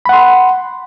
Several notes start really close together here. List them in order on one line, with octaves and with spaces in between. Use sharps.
B5 F#5 C6